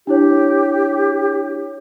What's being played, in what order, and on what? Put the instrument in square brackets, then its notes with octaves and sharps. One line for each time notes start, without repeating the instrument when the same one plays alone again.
[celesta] D4 E4 C#5 [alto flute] G4